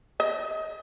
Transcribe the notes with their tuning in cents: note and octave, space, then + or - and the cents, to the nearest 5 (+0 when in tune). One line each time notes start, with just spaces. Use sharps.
D#5 +20